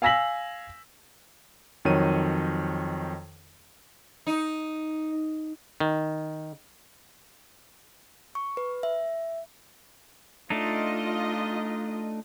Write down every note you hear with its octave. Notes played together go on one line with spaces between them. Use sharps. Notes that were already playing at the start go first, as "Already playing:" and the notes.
F5 G#5 E6 A#6 B6 F#7
F2 D#3 F#3 C#5 D#7
D#4
D#3
C#6
B4
E5
A3 D4 D#4 F4 D#5